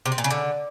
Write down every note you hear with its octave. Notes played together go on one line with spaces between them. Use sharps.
C3
C4
A#2
C#3
D3